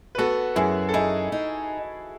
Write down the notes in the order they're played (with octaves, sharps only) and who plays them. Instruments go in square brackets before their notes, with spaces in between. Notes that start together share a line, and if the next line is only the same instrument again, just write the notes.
[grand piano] B4
[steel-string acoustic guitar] B3 [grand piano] F#4 A4
[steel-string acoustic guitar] F#2 [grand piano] E4 G#4
[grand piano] A4
[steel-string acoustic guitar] D#4 [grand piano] E4 G#4
[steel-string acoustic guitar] D#4